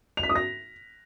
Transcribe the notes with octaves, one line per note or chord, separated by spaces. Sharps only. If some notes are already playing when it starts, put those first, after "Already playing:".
F7
B6
D#6
A#6